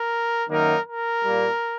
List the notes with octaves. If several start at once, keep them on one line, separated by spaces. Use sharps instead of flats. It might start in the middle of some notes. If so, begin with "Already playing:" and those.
Already playing: A#4
F#2 D#3 F#3 A#3 D#4 A#4
A#4
A#2 G3 A#3